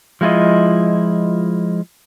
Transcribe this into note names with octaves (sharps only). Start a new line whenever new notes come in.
F3 G#3 E4 F4 D#5